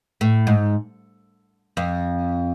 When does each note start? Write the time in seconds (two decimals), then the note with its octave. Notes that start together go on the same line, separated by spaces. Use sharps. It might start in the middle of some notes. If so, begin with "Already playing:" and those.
0.21 A2
0.47 G#2
1.77 F2